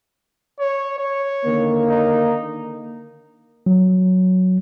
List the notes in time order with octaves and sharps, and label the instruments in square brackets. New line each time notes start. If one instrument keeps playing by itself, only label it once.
[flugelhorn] C#5
C#5
[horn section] D3 D#3 A#3
[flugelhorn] D#4
[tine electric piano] F#3